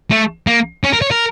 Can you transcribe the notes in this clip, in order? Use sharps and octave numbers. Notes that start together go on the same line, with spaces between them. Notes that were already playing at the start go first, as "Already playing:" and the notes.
A3
A#3
C#4
A#4
C#5
A#4